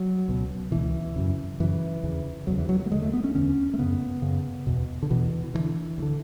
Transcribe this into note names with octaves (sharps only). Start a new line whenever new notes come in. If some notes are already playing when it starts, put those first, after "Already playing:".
Already playing: F#3
C#2 B2
C#2 B2 E3
F#2 C#3
F#2 C#3 E3
E2 C#3
E2 C#3 F#3
E3
F#3
F#3
A3
E2 D3 G#3
A3
B3
C#4
E2 D3 C#4
A3
F#2 C#3 B3
F#2 C#3
E2 B2
D3
E2 B2 E3
D2 D3 E3
D2
D3